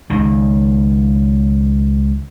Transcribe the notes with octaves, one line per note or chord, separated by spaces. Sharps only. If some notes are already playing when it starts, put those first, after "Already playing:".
C#2 D#3